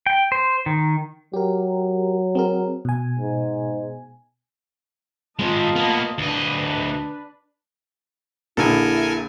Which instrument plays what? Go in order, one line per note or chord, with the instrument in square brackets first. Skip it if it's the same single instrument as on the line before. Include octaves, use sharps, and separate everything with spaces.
[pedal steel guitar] G5
C5
D#3
[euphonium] F#3 [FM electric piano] G4 A#4
[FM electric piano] C4 G#4 A#4
B2 G#5
[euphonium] G#2
[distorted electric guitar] G#3 C4 [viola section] F4 D#5 A5
[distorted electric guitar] A#3 B3
[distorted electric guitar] D2 D#5 [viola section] D4 B4
[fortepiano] A#1 D3 [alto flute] E4 [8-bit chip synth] A4 A#4 G#5